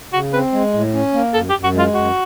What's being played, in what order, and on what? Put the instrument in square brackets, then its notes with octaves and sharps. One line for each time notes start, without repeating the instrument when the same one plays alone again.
[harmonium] C#3 [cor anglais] F#4
[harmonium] C4 [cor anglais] B4
[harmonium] G#3
A2
C#4
A#3
[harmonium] F#2 [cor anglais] A4
[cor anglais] G4
[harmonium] F#2
[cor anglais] F#4
[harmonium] G#3 [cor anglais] F4
[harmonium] F#2 [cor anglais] F#4